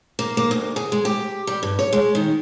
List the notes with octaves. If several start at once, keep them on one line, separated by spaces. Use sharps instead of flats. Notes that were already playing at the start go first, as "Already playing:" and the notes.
A#3
A#3
D2
G#4
G#3
G4
G3
G2
C#5
G#3
D#3